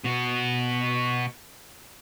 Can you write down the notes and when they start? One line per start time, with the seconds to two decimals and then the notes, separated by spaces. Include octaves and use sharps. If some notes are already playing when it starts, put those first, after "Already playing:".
0.04 B2 F#4